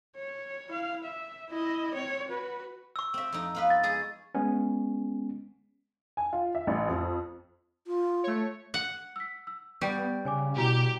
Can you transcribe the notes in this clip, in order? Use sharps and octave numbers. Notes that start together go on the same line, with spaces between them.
C#5
E4 F5
E5
E4 D#5
C4 C#5
F#4 B4
C#6 E6
C4 E5
F2 D#4
B3 F4 B4
A6
G#3 G#4
G#3 B3 C#4
G#5
F4
E5
A1
F2
F4
A3 C#5
F#5
E6 B6
E6
G3 B3 C#6 G6 D7
C#3 C#5 G#5 D6
B2 E4 F#4 G4 A#5